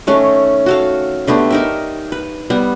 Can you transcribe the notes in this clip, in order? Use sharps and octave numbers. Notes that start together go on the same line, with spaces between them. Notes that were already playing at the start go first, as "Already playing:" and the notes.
D#3 A3 C#4
F#4 A4 F5
D3 A3 B3 G4
D#4 A#4 E5
B4
G3 B3